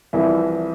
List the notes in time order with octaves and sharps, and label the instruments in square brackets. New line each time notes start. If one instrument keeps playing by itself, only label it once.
[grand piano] C2 C3 E3 F3 E4